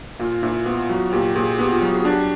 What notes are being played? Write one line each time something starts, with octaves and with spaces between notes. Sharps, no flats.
A#2 F4
A#2 E4
B3 F4
F#3 F#4
A#2 G4
A#2 G#4
B3 G4
F4
F#3 F#4
G#4
D4 G4